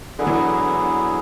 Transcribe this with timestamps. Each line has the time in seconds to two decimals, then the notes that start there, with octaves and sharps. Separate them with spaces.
0.19 D3 F#3 B3 E4 G#4
0.27 E3
0.35 D3